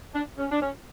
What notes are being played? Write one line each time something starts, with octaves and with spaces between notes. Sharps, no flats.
D4
C#4
D4
C#4